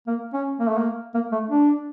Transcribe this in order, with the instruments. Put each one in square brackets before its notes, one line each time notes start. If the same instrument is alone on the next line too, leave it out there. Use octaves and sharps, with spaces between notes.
[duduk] A#3
C#4
A#3
A3
A#3
A#3
A3
D4